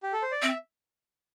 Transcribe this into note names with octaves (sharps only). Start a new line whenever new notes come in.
G4
A4
C5
D5
C4 E5